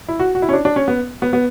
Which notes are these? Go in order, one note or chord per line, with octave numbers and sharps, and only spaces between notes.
E4
F#4
F#4
E4
C#4
D4
D4
C#4
B3
B3
B3